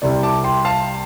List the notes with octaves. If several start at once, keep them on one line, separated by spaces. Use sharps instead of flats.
C2 C3 G3 D5
A5 D6
G5 C6
F5 A5